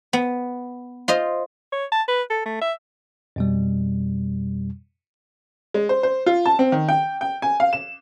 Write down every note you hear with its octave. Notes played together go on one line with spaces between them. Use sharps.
B3
F4 C5 D#5
C#5
A5
B4
A4
A3
E5
F2 B2 G3
G#3
C5
C5
F4
A5
C4
D#3
G5
G5
G#5
F5
E7